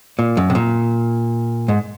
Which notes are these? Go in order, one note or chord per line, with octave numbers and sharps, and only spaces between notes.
A#2
F#2
C3
A#2
G#2